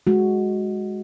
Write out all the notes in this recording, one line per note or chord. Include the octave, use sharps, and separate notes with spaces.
G#3 F#4